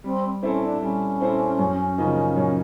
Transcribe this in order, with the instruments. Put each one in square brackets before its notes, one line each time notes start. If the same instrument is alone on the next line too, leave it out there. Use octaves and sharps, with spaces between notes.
[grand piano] G3 [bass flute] C4
[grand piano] C4 E4 A4 C5 [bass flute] C#4
[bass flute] D4
[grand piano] G3 [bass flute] C#4
[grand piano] C4 E4 A4 C5
F#2
C#3 F3 A#3 D#4
F#2